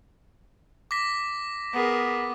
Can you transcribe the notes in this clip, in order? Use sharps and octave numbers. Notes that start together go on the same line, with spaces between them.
D6 A#6 B6
B3 G#4 A#4